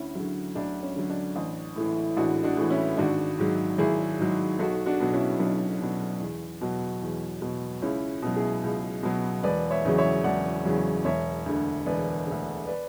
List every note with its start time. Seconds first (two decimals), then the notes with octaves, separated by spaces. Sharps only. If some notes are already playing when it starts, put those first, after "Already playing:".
Already playing: D2 C#4 E4
0.15 D3 F#3
0.55 D2 D4
0.83 C#4
0.96 D3 F#3
1.10 D4
1.36 A1
1.76 A2 E3
2.17 A1 D4 F#4
2.44 D4 F#4
2.57 A2 E3
2.70 C#4 E4
2.97 G#1 D4 F#4
3.39 G#2 F#3
3.78 G#1 E4 G#4
4.19 G#2 F#3
4.59 B1 F#4 A4
4.86 D4 F#4
5.00 B2 F#3
5.13 C#4 E4
5.40 B1 D4
5.81 B2 F#3
6.20 E2
6.61 B2 F#3
7.02 E2
7.42 B2 F#3
7.82 C#2 C#4 E4
8.22 B2 F#3
8.36 E4 G#4
8.64 C#2
9.03 B2 F#3
9.43 E1 B4 D5
9.71 C#5 E5
9.85 E2 C#3 F#3
9.98 C#5 E5
10.24 E1 D5 F#5
10.65 E2 C#3 F#3
11.05 E1 C#5 E5
11.46 D2 D3
11.86 E1 B4 D5
12.27 D2 D3
12.67 B4 D5